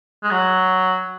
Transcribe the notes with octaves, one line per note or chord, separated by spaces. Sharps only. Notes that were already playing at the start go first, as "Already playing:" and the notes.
G#3
F#3